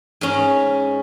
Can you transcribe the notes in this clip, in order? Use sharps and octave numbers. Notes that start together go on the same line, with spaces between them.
G#2 C#4